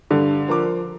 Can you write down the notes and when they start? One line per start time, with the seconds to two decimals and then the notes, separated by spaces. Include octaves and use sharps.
0.11 G2 D3
0.48 F3 A#4 D6